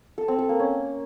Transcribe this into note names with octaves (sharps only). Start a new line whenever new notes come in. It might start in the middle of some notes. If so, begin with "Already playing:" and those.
A4
C4
A4
A#3
C#4